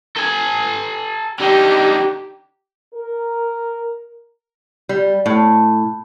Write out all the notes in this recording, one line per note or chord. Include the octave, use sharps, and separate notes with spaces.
A4 G#5
D3 D#4 G4
A#4
G3
A2